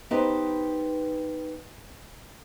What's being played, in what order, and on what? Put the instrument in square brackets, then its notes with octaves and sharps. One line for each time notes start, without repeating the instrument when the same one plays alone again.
[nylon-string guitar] B3 D#4 G4 B4 C5